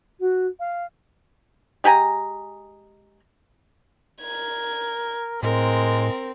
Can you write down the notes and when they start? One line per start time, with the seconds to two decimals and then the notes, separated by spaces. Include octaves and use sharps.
0.20 F#4
0.59 F5
1.84 G#3 G4 G#5 A#5
4.21 A#4 G#6
5.43 A2 G#3 C4 A#4